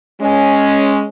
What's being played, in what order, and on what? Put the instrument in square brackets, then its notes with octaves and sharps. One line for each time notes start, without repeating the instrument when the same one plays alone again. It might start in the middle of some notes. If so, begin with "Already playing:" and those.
[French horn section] G#3 C#4